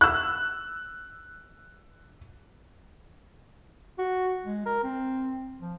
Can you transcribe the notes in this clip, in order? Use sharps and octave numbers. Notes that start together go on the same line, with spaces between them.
E6 F#6
F#4
G#3
A#4
C4
F3